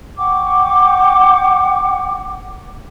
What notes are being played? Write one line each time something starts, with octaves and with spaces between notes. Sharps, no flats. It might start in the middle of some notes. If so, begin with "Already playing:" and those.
F#5 G5 C#6 D6